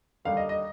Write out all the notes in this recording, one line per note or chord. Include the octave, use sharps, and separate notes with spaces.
D#2 D3 G3 F5
D#5
D#5